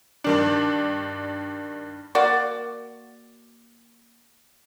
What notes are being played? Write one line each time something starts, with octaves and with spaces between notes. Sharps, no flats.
G2 D#3 D4
A#3 F#4 D5